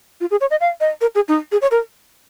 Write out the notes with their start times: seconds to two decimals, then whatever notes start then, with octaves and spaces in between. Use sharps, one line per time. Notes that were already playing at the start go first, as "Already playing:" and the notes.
0.21 F4
0.31 G#4
0.41 C#5
0.51 D#5
0.61 F5
0.80 D#5
1.01 A#4
1.15 G#4
1.28 D#4
1.52 G#4
1.62 C#5
1.71 A#4